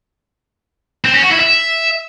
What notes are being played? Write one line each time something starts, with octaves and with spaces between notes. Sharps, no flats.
C4
C#4
F#4
E4
E5